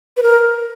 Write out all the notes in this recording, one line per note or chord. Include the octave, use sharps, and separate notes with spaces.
B4
A#4